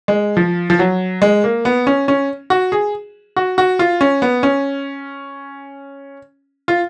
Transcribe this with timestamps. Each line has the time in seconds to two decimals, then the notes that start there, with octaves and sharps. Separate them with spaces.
0.08 G#3
0.37 F3
0.70 F3
0.79 F#3
1.22 G#3
1.44 A#3
1.65 B3
1.87 C#4
2.08 C#4
2.50 F#4
2.72 G#4
3.36 F#4
3.58 F#4
3.79 F4
4.01 C#4
4.22 B3
4.43 C#4
6.68 F4